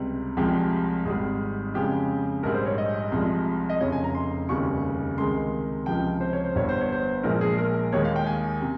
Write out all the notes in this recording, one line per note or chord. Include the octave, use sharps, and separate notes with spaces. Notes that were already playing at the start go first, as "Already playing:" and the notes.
Already playing: C#2 C3 G3
C2 C3 F3 G#3 G4
G#1 G#2 G3 G#4
F2 C#3 G#3 G4
A#1 G#2 G3 A#4
C5
C#5
D#5
C2 C3 F3 G#3
D#5
F1 F2 C#3 C#5
G#5
A#5
C6
F1 D#2 C#3 G3 C#6
C#2 C3 D#3 G#3 C6
C#2 C3 F3 G5
C5
C#5
C5
G1 G2 G3 C#5
C5
C#5
C5
A#1 A#2 F3 G#3 A#4
G#4
A#4
D#2 D#3 G#3 C#5
F5
G5
G#5
C3